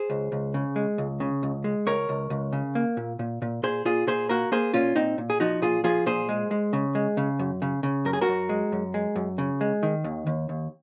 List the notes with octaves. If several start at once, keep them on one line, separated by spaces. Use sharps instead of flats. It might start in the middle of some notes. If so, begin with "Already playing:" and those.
Already playing: G#4 C5
C#2
C#2
C#3
G#3
C#2
C#3
C#2
G#3
C#2 A#4 C#5
C#2
C#2
C#3
A#3
A#2
A#2
A#2
A#2 G#4 C5
A#2 F4 G#4
A#2 G#4 C5
A#3 F#4 A#4
A#3 G#4 C5
A#2 C#4 F4
A#2 C4 D#4
A#2
G#4
F3 D#4 F#4
A#2 F4 G#4
F3 F4 G#4
A#2 G#4 C5
G#3
G#3
C#3
G#3
C#3
F#2
C#3
C#3
F#2 A#4
G#4
F#4 A#4
F#2
G#3
F#2
G#3
F#2
C#3
G#3
D#3
D#2
D#2
D#2